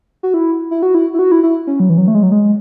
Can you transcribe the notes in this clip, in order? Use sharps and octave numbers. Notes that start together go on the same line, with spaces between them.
F#4
E4
E4
F#4
E4
E4
F#4
E4
E4
C#4
F#3
E3
F#3
A3
G#3
F#3
G#3